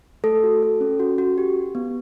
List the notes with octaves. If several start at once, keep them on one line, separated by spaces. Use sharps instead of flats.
A3 A4
F#4
A4
C#4
F#4
F#4
G4
G4
B3